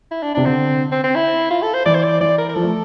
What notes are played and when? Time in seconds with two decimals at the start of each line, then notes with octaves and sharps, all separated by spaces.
0.11 E4
0.23 D4
0.34 C3 D4
0.45 D3 C4
0.92 C4
1.04 C4
1.15 E4
1.51 F4
1.62 A4
1.74 C5
1.85 E3 D5
1.95 C5
2.04 D5
2.20 E3 D5
2.38 A#4
2.49 A#4
2.55 F3 A4
2.63 A3